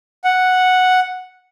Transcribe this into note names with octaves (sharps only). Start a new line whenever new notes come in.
F#5